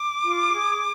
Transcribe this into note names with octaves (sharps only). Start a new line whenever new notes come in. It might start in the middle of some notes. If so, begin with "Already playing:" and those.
Already playing: D6
F4
G#4